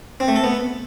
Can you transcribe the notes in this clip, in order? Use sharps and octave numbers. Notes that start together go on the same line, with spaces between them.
C4
A3
A4
B3